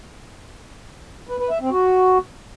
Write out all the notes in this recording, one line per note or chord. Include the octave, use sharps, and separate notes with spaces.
B4
B4
E5
C4
F#4